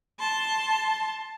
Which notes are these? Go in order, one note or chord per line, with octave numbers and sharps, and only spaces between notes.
A5 C6